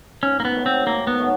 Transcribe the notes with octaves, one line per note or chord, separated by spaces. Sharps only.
G#2 C#4
A#3
B3
D#3 F#3 A3
C4
G#2 A#3
B3
D#3 F#3 A3